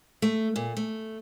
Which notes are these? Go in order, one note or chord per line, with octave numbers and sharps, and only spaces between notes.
A3
A#2
A3